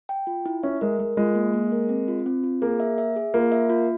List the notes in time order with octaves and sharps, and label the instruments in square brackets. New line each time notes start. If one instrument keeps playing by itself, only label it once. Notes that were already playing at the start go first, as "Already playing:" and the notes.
[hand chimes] G5
F4
E4
[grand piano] C#4 [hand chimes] E5
[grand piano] G#3 [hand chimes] A#4
[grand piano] G#3 [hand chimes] A#4
[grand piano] G#3 [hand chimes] F4
[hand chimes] A#3
A#3
A#4
C4
F4
C4
F4
[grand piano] A#3 [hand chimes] G#4
[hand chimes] E5
E5
G#4
[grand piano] A#3 [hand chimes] F4
[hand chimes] E5
F4